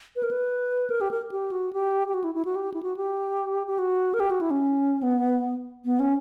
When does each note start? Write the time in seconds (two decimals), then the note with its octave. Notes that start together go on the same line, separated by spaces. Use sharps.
0.16 B4
0.23 A#4
0.31 B4
0.90 A#4
1.01 G4
1.11 A#4
1.31 G4
1.52 F#4
1.73 G4
2.08 G4
2.14 F#4
2.24 E4
2.35 E4
2.45 F#4
2.55 G4
2.74 E4
2.83 F#4
2.97 G4
3.67 G4
3.79 F#4
4.14 A#4
4.20 G4
4.31 F#4
4.41 E4
4.51 C#4
5.03 B3
5.85 B3
5.99 C#4